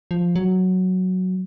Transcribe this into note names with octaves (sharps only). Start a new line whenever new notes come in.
F3
F#3